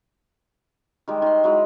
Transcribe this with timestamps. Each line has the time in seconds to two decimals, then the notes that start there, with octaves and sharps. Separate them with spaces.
1.08 D#3 G3 G#3
1.22 D#3 C6
1.44 F#3 G#3 E4